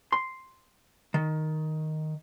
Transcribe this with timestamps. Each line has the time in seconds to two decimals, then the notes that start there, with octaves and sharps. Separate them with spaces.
0.12 C6
1.14 D#3